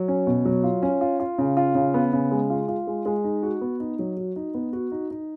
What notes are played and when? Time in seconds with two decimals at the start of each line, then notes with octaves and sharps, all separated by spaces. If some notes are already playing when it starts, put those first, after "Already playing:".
Already playing: F#3
0.08 C#4
0.27 B2
0.45 F#3
0.64 F4
0.83 C#4
1.01 F4
1.20 F4
1.38 C#3
1.57 F4
1.75 C#3
1.94 B3
2.13 C#3
2.31 G#3
2.50 F4
2.68 F4
2.87 G#3
3.06 G#3
3.24 D#4
3.43 F#4
3.61 B3
3.80 D#4
3.99 F#3
4.17 F#4
4.36 D#4
4.54 B3
4.73 F#4
4.92 D#4
5.11 D#4